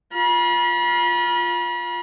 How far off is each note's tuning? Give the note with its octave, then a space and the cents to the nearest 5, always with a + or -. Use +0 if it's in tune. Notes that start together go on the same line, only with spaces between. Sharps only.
F4 +5 B5 -40